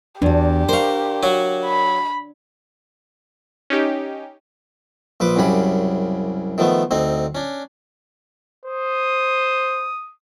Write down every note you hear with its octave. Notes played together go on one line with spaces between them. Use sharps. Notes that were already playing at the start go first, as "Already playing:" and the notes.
E2 D4 F#4 G4
A#4 C5 F5 C#6
F#3 F#4
B5
C#4 D#4 G4
A#1 F3 B4 D6
C2 F#2 C#3 G4 B5
D#3 F3 A3 B3
D2 C4 D#4
C#4 D4
C5 D#6